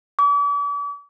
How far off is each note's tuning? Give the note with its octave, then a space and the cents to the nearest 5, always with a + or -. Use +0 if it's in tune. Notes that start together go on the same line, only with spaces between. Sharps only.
D6 -40